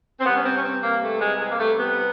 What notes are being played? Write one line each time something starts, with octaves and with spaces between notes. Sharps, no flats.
C4
C3 E3 G3 B3
C#4
C4
C#4
C4
A#3
A3
G#3
G#3
A#3
A3
B3